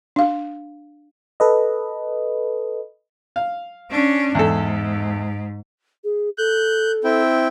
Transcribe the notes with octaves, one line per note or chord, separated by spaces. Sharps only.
D4 F5
A4 B4 D#5
F5
C#4 D4
E2 G#2 A4
G#4
A4 F#6 G6
C4 E4 G5